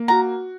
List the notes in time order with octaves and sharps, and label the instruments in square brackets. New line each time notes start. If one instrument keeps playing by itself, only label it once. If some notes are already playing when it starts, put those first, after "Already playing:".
Already playing: [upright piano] A#3
[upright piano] F#4 [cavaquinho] A#5